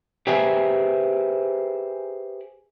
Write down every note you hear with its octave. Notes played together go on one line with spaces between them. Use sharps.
G4 G#4 B4 C5 E5 G#5